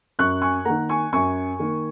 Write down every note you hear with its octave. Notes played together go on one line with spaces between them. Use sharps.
F#2 C#6 F#6
G#5 C#6
D#3 A#3 F#5 A#5
G#5 C#6
F#2 G#5 C#6
D#3 A#3